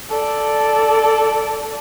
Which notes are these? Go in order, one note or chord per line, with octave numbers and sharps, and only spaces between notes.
A4 D5